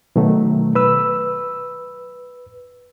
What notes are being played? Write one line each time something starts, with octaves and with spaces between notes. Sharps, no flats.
B2 D#3 F#3 A3
B4 E6